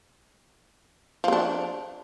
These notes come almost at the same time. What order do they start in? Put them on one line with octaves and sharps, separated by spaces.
F3 C4 D4